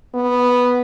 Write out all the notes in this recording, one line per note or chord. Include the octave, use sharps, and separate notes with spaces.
B3